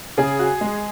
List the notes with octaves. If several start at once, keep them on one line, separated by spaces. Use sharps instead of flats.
C#3 G#4
F#4
G#3